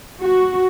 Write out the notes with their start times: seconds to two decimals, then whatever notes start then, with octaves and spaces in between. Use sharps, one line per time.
0.21 F#4